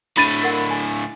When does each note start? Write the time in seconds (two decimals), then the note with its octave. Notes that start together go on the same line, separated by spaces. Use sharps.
0.17 A2 D3 D4 B5 A6 D#7
0.43 A#4 F#5
0.70 G#5